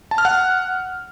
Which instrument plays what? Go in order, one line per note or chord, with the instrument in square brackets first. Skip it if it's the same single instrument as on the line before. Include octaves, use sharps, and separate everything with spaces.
[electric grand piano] A5
F6
F#5